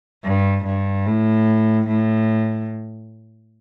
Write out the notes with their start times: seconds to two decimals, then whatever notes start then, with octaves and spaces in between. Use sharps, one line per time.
0.24 G2
0.65 G2
1.06 A2
1.88 A2